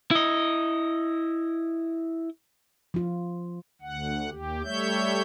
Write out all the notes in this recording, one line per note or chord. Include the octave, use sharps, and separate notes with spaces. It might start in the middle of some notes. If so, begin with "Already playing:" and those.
E4 D#5
F3 F4
D2 F#5
D#2 G4
G3 A3 C#5 E5 G6